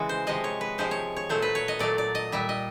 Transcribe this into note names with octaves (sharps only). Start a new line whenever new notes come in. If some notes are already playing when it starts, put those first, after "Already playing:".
Already playing: C#3 E3 G#3 E4 F#4
C5
C3 F3 G#3 D#5
C#5
B4
C3 F3 G#3 C5
C#5
C#5
A#2 F#3 A3 C5
B4
C#5
D#5
A#2 F#3 A3 D5
D5
D#5
A#2 G3 E5
D#5